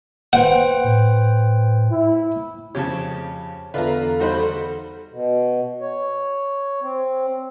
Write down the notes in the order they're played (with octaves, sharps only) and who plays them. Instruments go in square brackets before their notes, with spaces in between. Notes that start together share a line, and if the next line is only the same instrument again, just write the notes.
[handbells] B4 C5 G5 [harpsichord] F#5
[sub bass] A2
[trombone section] E4
[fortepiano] F2 C#3 G4 [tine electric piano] C#5 A5
[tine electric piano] E2 D3 [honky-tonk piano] F4 A#5 [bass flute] A4 [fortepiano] B4 D5 E5
[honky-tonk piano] G3 D#4 C5 [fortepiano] F#4 B5
[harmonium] B2
C#5
C4